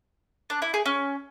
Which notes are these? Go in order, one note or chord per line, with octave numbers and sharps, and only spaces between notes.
D4
E4
G#4
C#4